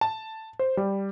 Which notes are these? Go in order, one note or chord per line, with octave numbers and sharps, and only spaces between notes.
A5
C5
G3